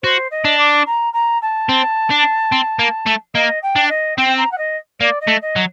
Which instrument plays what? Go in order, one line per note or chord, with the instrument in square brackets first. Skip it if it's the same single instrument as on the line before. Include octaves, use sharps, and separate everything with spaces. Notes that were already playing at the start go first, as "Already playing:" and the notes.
[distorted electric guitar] F#4 [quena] C5
[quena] D#5
[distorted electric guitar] D4
[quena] D6
A#5
A#5
A5
[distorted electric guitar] C4
D4
C4
A#3
A3
[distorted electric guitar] A#3 [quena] D#5
[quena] G5
[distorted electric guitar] D4
[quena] D#5
[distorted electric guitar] C4 [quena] G5
[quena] A#5
F#5
D#5
[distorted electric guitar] A#3 [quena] D5
[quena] D#5
[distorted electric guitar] A3
[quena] D#5
[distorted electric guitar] F#3